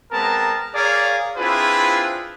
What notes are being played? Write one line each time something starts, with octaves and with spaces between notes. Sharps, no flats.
G#3 B3 C4 A#4 A5 A#5
G#4 A#4 C#5 D5 F5
C4 D4 E4 F4 G#4 B4